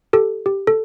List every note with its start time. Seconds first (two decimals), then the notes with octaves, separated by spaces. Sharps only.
0.13 G4 A4
0.46 G4
0.67 A4